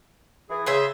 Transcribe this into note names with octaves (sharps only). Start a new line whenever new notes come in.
E3 G#4
C#3 G#4 C5 E5